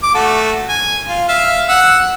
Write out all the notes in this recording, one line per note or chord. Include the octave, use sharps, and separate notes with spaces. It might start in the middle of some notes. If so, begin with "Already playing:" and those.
D6
A3 F#4 A4
G#5
F4
E5 F5
F#5 E6